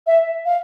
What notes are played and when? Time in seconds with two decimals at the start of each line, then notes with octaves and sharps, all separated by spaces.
0.07 E5
0.45 F5